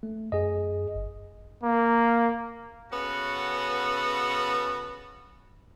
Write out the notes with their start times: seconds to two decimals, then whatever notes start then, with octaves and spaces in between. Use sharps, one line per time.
0.03 A3
0.32 F#2 G#4 D#5
0.95 G1
1.63 A#3
2.92 C#3 B3 C#4 F#4 A4